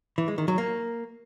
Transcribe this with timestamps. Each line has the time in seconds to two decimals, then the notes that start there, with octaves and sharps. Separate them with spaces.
0.18 E3
0.28 G#3
0.38 D#3
0.48 F#3
0.58 A#3